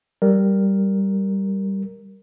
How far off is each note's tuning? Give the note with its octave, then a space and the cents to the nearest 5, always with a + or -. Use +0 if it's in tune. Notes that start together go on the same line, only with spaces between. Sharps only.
G3 -5 A#4 +0